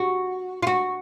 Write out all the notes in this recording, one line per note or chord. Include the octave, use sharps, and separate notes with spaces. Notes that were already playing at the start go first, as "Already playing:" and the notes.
Already playing: F#4
F4
F#4